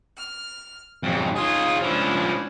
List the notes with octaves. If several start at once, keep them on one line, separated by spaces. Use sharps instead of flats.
F6
F2 G#2 F#3 A3
D#4 F4 G#4 C#5 C6
F3 G#3 C#4 D4 E4